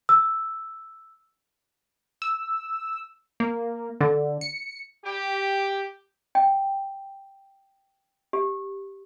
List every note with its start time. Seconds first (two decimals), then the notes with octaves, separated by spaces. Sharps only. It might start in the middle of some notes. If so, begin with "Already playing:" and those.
0.09 E6
2.22 E6
3.40 A#3
4.01 D3
4.41 C#7
5.05 G4
6.35 G5
8.33 G4